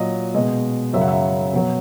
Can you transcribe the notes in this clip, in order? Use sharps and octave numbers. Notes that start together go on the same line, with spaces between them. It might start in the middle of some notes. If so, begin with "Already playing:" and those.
Already playing: A#2 F#3 D#5
B2 G#3 D#5
F#2 C#3 F#3 E5
F#5
E5
B2 F#3